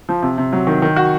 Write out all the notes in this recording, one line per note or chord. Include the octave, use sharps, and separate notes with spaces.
F3
C3
C3
F#3
D#3
D#3
F#4